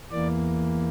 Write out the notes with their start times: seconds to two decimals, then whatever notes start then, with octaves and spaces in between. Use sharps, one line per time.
0.11 E2 E3 A#3 D5